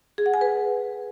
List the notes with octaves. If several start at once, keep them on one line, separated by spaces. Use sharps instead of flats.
G#4
F#5
G#5
B4